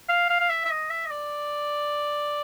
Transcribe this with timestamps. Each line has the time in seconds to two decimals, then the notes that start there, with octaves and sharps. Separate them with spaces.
0.09 F5
0.30 F5
0.40 F5
0.50 E5
0.65 E5
0.70 D#5
0.90 E5
1.05 D#5
1.11 D5